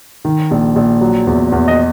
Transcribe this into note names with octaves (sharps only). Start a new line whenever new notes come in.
D#3
A#1
A#1
F#3
E2
E2
D#5